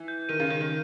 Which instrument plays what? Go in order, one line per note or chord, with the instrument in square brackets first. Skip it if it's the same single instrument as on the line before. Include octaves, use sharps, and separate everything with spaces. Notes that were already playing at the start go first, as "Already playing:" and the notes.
Already playing: [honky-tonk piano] E3
[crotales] G6
[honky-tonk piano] D#3 [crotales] D#7
[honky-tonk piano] C#3
[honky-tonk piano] D#3 [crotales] G6
[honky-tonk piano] D#3